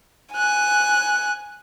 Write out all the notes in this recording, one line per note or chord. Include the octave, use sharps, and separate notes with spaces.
G#5 F#6